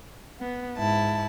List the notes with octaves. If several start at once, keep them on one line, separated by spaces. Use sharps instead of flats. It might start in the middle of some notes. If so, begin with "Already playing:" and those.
B3
G#2 E4 A5